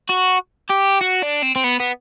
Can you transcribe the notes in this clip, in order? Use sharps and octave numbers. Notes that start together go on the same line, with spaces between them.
F#4
G4
F#4
D4
C4
C4
B3
B3